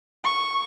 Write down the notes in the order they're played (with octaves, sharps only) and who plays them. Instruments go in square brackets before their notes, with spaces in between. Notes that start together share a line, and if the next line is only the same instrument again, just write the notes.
[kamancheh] C#6